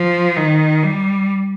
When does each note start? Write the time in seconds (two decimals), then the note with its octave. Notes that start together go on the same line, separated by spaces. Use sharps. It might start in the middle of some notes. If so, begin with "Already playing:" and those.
Already playing: F3
0.37 D#3
0.83 G3